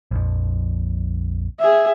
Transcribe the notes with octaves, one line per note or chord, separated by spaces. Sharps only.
A#1 F2
G#4 E5